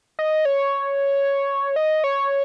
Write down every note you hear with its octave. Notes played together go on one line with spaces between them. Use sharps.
D#5
C#5
D#5
C#5